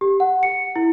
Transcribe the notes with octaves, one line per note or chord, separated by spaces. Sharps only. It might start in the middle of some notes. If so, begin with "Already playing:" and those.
G4
F#5
C#7
E4